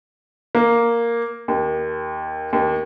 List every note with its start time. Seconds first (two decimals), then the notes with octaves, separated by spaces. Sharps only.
0.55 A#3
1.48 D#2
2.53 D#2